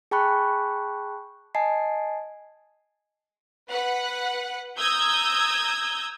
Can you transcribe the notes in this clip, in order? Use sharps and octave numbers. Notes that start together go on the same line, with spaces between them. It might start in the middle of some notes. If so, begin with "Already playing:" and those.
G#4 G5 A5 B5 C#6 F#6
D#5 G#5 A5 C7
B4 F#5
A#5 D#6 E6 G6 G#6